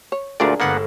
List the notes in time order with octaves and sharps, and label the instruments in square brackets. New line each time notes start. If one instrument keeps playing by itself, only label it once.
[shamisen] C#5
[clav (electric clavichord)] D2 A#2 D5 [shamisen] D4 G#4 A#4
[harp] G1 G#3 A4 [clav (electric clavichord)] A#3 B3 F#5